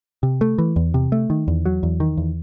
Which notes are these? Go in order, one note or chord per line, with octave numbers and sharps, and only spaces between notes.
C3
A3
E3
E2
C3
A3
D#3
E2
F#3
E2
D#3
E2